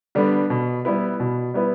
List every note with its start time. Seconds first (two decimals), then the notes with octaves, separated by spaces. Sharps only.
0.15 D3 G3 B3 D4
0.50 B2
0.85 G3 B3 E4 B4
1.20 B2
1.54 G3 B3 E4 B4